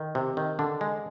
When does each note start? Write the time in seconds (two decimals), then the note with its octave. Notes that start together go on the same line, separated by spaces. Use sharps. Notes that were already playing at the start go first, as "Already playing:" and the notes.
Already playing: D#3
0.15 C3
0.37 D#3
0.59 D3 D4
0.81 G#3